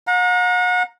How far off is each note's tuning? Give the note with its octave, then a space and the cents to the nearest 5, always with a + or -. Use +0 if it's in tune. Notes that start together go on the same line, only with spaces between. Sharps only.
F#5 -40 A#5 +0